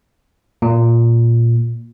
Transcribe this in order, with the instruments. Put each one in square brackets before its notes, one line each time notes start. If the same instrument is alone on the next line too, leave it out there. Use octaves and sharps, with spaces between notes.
[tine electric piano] A#2